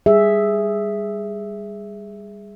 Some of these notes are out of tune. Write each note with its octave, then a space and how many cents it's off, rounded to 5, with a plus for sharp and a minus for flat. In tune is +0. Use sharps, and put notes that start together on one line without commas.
G3 +20 G#4 +0 E5 +0